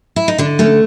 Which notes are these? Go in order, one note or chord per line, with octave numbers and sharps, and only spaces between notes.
E4
D#4
D3 D4
A3 C#4